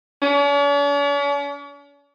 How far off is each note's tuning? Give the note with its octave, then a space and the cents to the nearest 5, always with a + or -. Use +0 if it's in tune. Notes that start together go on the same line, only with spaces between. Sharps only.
C#4 +45